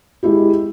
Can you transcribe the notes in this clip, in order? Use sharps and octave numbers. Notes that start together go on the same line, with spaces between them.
G#3 E4 G4